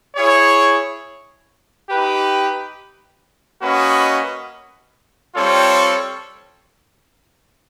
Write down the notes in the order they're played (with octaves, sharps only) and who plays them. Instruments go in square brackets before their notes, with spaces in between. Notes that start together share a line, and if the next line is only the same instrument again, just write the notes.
[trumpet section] E4 G#4 C#5
D#4 G4 B4
A#3 C#4 F#4 B4 D#5
G3 C4 F4 A4 C#5